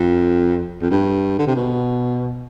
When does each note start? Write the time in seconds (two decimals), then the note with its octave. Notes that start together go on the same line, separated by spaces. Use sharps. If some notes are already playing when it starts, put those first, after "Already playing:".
Already playing: F2
0.82 F2
0.91 G2
1.39 D3
1.47 C3
1.56 B2